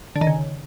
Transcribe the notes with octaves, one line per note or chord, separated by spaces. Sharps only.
D3
D#3
C#3